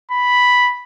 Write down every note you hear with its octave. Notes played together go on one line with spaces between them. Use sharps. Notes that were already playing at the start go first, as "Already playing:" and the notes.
B5